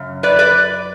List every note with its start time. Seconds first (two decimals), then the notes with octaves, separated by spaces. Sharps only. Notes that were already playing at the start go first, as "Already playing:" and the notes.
Already playing: F#2 C#3
0.23 B4 D5
0.39 B4 D5